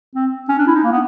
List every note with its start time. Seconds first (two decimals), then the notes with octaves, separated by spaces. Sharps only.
0.15 C4
0.49 C#4
0.58 D4
0.67 E4
0.75 D#4
0.84 A#3
0.92 B3